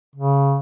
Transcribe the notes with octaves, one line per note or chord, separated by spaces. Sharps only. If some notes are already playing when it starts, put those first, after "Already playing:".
C#3